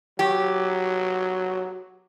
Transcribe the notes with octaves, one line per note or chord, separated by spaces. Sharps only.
F#3 G4